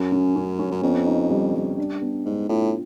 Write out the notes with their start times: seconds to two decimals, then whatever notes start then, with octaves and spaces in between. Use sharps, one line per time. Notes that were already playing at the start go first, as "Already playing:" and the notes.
Already playing: F#2 C#4
0.12 C#4
0.36 C#4
0.59 C#4
0.71 F#2
0.83 F2 B3
1.06 D#4
1.30 G3
1.54 G3
1.78 D4
2.02 B3
2.25 G#2 D4
2.49 A2 F4